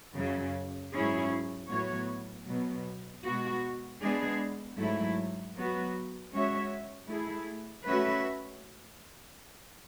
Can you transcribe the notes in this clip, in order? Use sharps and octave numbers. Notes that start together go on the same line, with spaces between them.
F#2 C#3 F#3
G#2 F#3 C#4 E4 G#4
A2 F#3 B3 F#4 C#5
B2 F#3 B3
B2 G#3 B3 F#4
G#3 B3 D4 G#4
G#2 F#3 A3 E4
F#3 B3 F#4
G#3 C#4 F#4 C#5 E5
A3 E4 G#4
A3 C#4 F#4 B4 E5